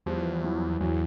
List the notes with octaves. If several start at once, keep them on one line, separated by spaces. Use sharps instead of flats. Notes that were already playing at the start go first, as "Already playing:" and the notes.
E2 F3 G3
E3 F#3
E2 E3 F#3